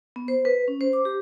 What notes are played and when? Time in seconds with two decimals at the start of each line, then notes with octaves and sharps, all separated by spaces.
0.16 B3
0.28 C5
0.45 B4
0.68 C#4
0.81 C5
0.93 D6
1.05 G4